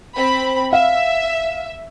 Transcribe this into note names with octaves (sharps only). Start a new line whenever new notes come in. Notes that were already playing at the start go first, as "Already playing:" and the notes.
C4 B5
E5 F5